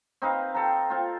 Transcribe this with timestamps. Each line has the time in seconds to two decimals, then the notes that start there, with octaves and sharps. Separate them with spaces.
0.22 C4 D#4 B4 F5
0.54 A4 G5 A#5
0.90 C4 F4